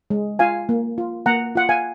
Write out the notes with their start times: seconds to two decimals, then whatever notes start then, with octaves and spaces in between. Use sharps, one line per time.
0.10 G#3
0.39 F4 F5 G#5
0.69 A#3
0.98 F4
1.26 A#3 F#5 A#5
1.55 F4 F#5
1.69 F5 G#5